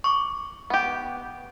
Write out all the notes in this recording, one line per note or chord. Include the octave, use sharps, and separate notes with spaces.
C#6 D6
B3 G4